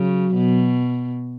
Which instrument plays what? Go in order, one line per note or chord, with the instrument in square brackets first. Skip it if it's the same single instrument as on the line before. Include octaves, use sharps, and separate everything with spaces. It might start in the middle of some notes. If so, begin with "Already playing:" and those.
Already playing: [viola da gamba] C#3 [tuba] F#3
[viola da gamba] B2